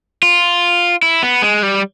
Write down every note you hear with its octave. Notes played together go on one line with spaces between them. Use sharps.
F4
E4
B3
G#3
G3